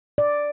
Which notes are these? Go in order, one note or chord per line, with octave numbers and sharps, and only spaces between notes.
D5